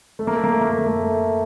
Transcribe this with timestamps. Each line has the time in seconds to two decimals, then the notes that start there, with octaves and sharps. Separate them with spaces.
0.19 A3
0.27 A#3
0.36 A3
0.44 A#3
0.52 A3
0.61 A#3
0.70 A3
0.78 A#3
0.86 A3
1.03 A3